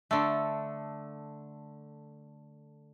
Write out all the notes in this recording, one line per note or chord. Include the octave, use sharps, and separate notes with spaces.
D3 A3